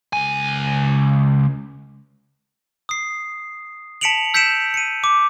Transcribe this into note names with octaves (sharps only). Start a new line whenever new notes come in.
C#2 G#5
D#6 C7
A5 B6 C#7 D7 F7 F#7
E6 G6 B6 C#7 D7 E7
C#7 D#7
D6